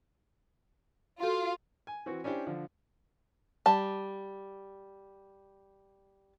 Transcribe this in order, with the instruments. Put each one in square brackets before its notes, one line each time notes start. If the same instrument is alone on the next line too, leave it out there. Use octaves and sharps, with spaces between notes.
[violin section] F4 [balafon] F#4 A4
[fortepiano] G#5
E3 C4 F#4
C#4 D4 E4 G4 C5
D3 F3
[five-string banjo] G3 A5